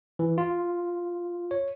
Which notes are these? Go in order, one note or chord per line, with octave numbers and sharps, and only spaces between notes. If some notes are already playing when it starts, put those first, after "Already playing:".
E3
F4
C#5